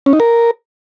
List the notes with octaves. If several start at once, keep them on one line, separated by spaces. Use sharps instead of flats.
C#4
D#4
A#4